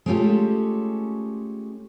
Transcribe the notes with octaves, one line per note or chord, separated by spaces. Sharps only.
G#3 A3 C#4 F4 G4 A4